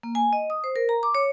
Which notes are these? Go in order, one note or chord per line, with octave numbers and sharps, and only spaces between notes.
A#3
G#5
D#5
D#6
C5
A#4
A#5
D6
C#5